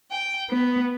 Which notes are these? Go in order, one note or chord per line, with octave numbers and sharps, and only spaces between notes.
G5
B3